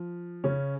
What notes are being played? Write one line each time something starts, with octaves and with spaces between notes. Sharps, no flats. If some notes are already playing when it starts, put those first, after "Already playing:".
Already playing: F3
C#3 C#4